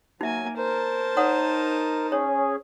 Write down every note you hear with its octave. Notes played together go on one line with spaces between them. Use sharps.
F#3 A#3 D#4 E5 G#5
A#4 C5 A5
D#4 C#5 F#5 D#6
C#4 G#4 C#5